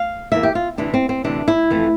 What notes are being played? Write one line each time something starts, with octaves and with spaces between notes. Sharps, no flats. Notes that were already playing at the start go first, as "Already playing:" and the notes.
Already playing: F5
E2 E3 A#3 E5
G4
F4
D2 C3 E3 D4
C4
C4
D2 C3 E3 D4
E4
F2 E3 A3